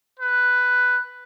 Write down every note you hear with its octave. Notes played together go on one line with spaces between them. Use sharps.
B4